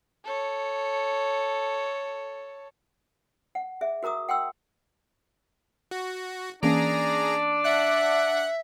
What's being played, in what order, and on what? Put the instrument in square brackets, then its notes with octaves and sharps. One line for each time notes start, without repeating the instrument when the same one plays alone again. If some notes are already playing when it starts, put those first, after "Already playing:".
[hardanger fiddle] A4 C#5
[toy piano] F#5
G#4 E5
F#4 A#4 A#5 D6 D#6
F#5 G5 C6 E6
[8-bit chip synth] F#4
[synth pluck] E3 A#3 C#4 [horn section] D4 D5 [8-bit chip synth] G#4 A#5
[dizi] E5 [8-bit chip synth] F#5 F#6